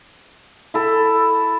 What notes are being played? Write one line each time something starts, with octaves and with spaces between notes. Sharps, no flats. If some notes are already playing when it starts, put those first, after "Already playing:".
E4 A4